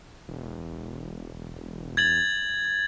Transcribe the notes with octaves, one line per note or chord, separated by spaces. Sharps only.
E1
G#6 A6 F#7